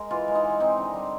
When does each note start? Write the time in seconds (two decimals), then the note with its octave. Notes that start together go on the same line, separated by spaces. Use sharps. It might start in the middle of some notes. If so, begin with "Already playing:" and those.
Already playing: G#3 A#4
0.11 E3 F4
0.28 G#3
0.35 D#4
0.43 E3
0.60 C4 D#4
0.78 D3
0.94 G3